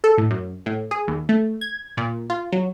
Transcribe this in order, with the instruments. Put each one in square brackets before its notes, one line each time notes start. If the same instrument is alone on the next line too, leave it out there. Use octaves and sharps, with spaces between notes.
[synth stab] A4
A2
F#2
A2
G#4
D#2
A3
G#6
A#2
F4
F#3